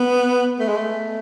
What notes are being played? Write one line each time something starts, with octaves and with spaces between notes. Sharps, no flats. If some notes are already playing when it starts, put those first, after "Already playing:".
Already playing: B3
A3
G#3
A3